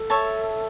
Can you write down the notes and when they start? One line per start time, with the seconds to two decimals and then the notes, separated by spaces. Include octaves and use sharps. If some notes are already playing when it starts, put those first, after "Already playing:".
Already playing: A4
0.10 C#5 E5 A5